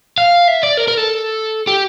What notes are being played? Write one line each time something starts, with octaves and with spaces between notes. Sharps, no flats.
F5
E5
D5
A#4
A#4
A4
G4